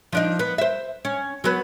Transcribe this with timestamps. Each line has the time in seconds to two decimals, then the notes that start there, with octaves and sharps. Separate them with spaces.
0.13 F3 D4 D#4
0.39 B3
0.58 C5 E5
1.05 C#4
1.44 F#3 B3 B4